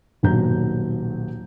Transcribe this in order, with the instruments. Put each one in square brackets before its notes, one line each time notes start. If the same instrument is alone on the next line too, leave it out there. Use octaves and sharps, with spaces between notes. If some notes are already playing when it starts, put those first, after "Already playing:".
[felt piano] D#1 B1 F#3 A#5 G6